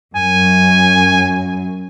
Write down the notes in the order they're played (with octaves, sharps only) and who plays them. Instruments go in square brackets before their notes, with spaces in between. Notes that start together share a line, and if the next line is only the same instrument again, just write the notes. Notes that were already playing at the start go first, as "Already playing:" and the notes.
[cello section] F#2 F#3 [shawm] G#5